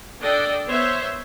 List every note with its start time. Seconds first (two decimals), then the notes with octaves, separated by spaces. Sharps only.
0.21 D4 A4 D5 D#5 G5
0.68 B3 C5 C#5 E5